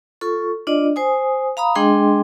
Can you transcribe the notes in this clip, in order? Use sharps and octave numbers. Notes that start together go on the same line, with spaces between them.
F4 A4 C#6
D4 F4 D5 D#5
C5 G#5 D#6
F5 A#5 B5 D#6
G#3 D4 G#4 D#5 G5 C6